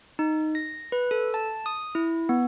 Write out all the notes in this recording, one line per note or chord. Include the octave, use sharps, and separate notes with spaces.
D#4
A#6
B4
A4
A5
D#6
E4
B3